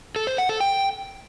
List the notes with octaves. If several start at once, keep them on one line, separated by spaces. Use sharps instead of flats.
A4
C5
F#5
A4
G5